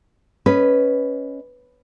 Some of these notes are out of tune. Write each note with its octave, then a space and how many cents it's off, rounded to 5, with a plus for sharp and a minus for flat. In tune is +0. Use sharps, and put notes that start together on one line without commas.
C#4 +0 B4 +0 D#5 +0